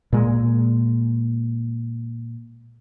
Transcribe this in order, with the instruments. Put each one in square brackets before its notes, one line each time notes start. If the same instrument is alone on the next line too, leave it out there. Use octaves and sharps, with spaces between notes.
[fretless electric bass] A#2 G#3